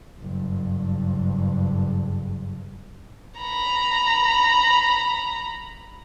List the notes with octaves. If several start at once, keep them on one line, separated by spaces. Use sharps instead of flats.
F#1 G2
A#5 B5